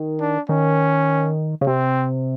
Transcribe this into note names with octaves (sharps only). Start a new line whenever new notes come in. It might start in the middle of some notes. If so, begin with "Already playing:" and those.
Already playing: D#3
D4
D#3 C#4
C#3
C3 C4